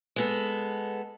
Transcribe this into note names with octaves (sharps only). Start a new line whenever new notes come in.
G#3 B3 A4